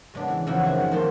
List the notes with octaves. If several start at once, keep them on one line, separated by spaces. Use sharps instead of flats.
C#3 G#3 B3 D4
E3
C#3 E3 F3 D#4 E4 F#4
F#2 G#3 C4 F#4 C5 G#5
F3 F#5
D#3 F#3 A#3 C5 A5 C6